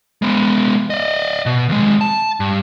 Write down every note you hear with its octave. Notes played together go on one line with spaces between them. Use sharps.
G#3 B3
D5 D#5
B2
D#2 G#3
A5
G2